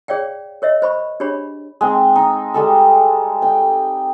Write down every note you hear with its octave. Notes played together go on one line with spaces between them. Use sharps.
G#4 C#5 D5 F5 G5
A#4 C#5 D#5 E5
C5 B5 C#6
D4 G4 G#4 C#5 B5
G#3 C4 D#4
D#4
G3 G#3 A4
G5